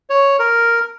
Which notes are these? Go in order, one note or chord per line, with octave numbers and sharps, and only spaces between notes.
C#5
A#4